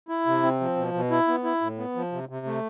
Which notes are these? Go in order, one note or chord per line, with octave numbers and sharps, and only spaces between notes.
E4
C3
C4
F3
B2
B2
E4
B3
E4
A2
B3
F3
C3
C3
A3